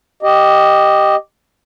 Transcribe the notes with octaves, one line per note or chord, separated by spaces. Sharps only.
G4 D#5